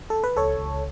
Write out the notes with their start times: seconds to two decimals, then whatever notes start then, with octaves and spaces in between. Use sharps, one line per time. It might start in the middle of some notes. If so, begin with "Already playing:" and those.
0.10 A4
0.24 B4
0.37 C#2 A4 C#5
0.59 C#2